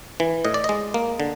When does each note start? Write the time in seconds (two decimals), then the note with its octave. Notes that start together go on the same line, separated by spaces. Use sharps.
0.20 E3
0.45 A2 D#5
0.54 D5
0.64 G#3 D#5
0.94 A#3
1.20 D3